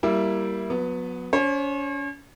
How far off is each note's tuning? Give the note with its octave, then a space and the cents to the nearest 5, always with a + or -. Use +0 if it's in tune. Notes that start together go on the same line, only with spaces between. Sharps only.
G3 -10 A#3 +0 E4 +0
F#3 -35 B3 +0
C#4 +35 C#5 -45